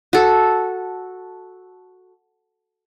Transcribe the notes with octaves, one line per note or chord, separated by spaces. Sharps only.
F#4 A4